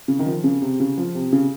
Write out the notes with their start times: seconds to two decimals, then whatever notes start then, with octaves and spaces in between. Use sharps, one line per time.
0.08 C#3
0.19 D#3
0.26 F3
0.44 C#3
0.62 C3
0.80 C#3
0.97 F3
1.15 C3
1.33 C#3